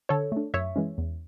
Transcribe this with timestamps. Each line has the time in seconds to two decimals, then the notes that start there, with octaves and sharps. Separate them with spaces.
0.09 D3 A4 C#5
0.32 A3 D4
0.54 F#2 C#5 E5
0.76 E3 G#3 C#4
0.98 E2